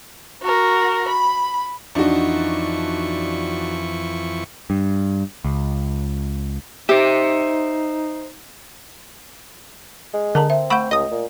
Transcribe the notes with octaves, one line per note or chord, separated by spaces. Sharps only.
F#4 A#4
B5
F2 E3 D4 D#4 F#4 C#6
G2
C#2
D#4 G4 C5 E5
G#3
D3 A#4 A5 A#5
C4 E5
A3 F#5 B5 C#6 G6
C#2 D#5 D#6
A#2